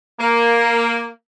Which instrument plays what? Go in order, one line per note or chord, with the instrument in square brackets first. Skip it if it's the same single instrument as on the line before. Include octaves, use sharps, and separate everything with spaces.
[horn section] A#3